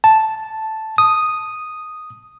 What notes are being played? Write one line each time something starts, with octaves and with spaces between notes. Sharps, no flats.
A5
D#6